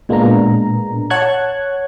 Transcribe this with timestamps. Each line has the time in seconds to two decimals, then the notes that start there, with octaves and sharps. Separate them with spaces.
0.09 A#2 G#3 A#3 B3 D4 A#5
1.10 C#5 F#5 A5 C#6 F#6 G#6